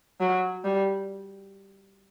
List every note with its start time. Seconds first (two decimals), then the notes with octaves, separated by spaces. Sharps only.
0.20 F#3
0.64 G3